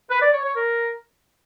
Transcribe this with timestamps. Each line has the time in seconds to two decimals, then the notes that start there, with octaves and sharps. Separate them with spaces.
0.10 B4
0.21 D5
0.32 C#5
0.43 C#5
0.55 A#4